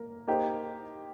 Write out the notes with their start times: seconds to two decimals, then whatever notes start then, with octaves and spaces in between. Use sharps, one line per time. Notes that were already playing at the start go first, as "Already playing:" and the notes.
Already playing: A#3 A#4
0.27 A#3 D#4 G4 C5